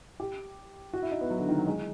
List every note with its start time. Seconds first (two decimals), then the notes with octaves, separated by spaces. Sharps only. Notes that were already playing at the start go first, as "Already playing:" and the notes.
0.20 G4
0.93 F#4
1.02 E4
1.11 D#4
1.21 B3
1.30 F#3
1.39 D3
1.49 D#3
1.58 F#3
1.67 G#3